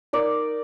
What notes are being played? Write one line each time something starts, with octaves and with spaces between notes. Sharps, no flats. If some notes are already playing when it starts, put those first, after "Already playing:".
D#4 A#4 D5